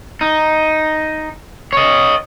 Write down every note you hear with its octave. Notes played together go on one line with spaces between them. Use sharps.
D#4
C#5 D#5